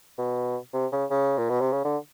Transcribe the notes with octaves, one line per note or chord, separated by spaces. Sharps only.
B2
C3
C#3
C#3
A#2
B2
C3
C#3
D3